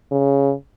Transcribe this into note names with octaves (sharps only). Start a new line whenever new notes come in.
C#3